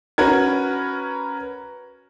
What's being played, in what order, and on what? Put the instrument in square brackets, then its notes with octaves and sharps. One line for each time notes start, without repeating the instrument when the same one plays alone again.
[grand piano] C#4 F#4 A#4 B4 G#6